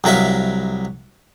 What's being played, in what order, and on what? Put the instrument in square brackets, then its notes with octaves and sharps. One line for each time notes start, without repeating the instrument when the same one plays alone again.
[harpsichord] C2 F#3 A#4 E5 F5